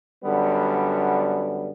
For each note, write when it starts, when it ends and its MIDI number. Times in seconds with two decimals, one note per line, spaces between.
0.24 1.70 42
0.24 1.70 50
0.24 1.70 55
0.24 1.70 59